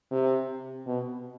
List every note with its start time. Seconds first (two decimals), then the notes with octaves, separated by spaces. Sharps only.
0.12 C3
0.87 B2